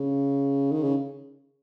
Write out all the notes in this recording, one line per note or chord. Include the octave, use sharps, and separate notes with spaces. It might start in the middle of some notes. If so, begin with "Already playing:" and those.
Already playing: C#3
D#3
C#3